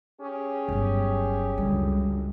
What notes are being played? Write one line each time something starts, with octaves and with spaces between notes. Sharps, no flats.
C#4 G4 G#4
G1 F#3
C#2 F#2 D3 G3